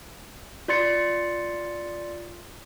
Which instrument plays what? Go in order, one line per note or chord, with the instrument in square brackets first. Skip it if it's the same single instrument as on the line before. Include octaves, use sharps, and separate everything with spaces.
[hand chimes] F4 D5 C6 A6 C#7